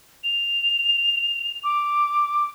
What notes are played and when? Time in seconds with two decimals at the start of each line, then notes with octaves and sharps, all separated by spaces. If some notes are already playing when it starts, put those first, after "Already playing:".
0.24 F7
1.64 D6